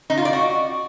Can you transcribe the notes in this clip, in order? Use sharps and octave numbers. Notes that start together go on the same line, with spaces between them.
D#4
F4
D5
F#4